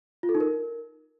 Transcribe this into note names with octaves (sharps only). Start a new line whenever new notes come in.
F4
A4
D#4
A#4